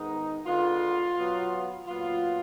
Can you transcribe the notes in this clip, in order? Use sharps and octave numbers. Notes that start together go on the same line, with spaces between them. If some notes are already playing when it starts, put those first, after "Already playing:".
Already playing: G#2 D#3 G#3 B3 D#4
D3 G#3 B3 F4
B2 F#3 B3
A#2 F#3 B3 F4